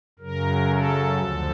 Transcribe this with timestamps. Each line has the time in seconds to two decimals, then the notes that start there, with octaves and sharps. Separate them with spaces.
0.19 F#2 C#3 F#3 A#4
0.69 A4
1.19 D2 D3 F3